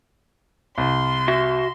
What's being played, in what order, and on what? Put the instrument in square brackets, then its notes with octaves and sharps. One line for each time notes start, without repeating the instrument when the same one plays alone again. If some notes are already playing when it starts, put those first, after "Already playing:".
[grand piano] C2 [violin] C6
[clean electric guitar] F#4 E5